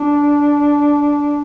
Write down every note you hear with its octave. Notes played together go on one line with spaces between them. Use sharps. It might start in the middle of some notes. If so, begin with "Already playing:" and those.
Already playing: D4